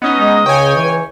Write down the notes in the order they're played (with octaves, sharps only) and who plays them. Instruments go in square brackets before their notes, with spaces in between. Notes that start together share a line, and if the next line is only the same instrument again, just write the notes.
[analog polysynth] B3 C#4 D#4 [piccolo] D#5
[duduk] G#3
[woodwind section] C#2 C#5 [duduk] C#3 [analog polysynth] G5 G#5
[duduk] E3